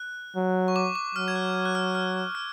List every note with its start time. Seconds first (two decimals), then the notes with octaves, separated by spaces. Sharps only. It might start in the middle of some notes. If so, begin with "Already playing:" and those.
Already playing: F#6
0.36 F#3
0.68 C#6
0.76 D6
0.95 D6
1.15 F#3 F6
1.28 G#6
1.36 F#6
1.65 F#6
1.75 F6
1.95 F6
2.35 F6